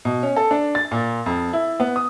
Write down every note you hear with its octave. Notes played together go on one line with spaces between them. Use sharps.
B2
C#4
A4
D4
A6
A#2
F2
E4
B3
D#6